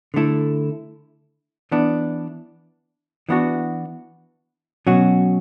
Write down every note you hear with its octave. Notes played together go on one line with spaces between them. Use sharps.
D3 A3 E4
E3 B3 D4
E3 B3 D4 F#4
B2 F#3 C#4 F#4